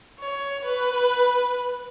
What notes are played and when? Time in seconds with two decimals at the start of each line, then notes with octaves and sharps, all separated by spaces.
0.20 C#5
0.65 B4